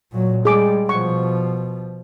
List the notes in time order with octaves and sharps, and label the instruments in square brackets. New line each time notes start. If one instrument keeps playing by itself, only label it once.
[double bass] A#2 F#3
[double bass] G3 G#3 [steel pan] G#4 D6
[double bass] B2 F3 [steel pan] C#6